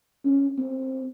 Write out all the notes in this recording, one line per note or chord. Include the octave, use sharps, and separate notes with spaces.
C#4
C4